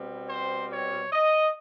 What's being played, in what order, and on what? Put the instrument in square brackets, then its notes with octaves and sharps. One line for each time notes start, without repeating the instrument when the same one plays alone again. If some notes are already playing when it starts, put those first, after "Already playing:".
Already playing: [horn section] B2 G3 C4
C5
C#5
D#5